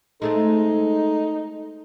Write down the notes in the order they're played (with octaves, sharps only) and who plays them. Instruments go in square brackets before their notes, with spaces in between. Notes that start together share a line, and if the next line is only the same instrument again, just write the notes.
[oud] G#3 A3 C4 [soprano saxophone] D#4 [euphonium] A4